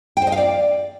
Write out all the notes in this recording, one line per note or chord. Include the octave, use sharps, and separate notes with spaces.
G5
C5
D#5
F5
D5